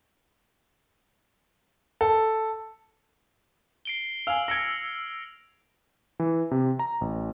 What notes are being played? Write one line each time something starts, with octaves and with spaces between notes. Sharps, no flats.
A4
C7 D7 G7
F5 G#5 E6 F6 F7
E6 G#6 A#6 C#7 D7
E3
C3
A#5
A1